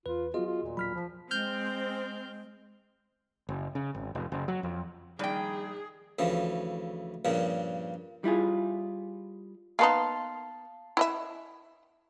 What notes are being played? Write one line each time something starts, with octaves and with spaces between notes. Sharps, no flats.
E2 F4 B4
F#3 B3 F4 F#4 G#4 D#5
F4
D#1 A#2
A1 D#2 F#3 B5 F6 B6
F3
G#3 C4 F6 G6
F#1
C#3
G#1
F1
F#1
F#3
F2
A#1 D#3 G3 G#4 D5 G5
D2 C#3 E3 F3
G2 A#2 C#3 F3
G3 E4 F4 G#4
A#3 B3 D#4 F5 A5 C6
E4 D#5 E5